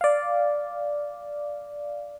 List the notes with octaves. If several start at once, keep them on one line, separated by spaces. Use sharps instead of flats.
D5 F5